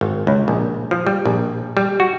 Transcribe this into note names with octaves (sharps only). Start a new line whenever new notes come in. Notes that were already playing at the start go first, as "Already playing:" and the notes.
G#1
C#2
A#1
F3
G3
A#1
G3
F#4